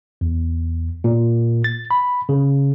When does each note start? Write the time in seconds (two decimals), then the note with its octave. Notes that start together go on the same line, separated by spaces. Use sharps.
0.21 E2
1.04 A#2
1.64 A6
1.91 B5
2.29 C#3